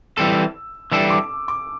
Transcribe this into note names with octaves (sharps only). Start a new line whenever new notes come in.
E3 G3 C4 A4 E6
E3 G3 D4 A4 E6
D6
D6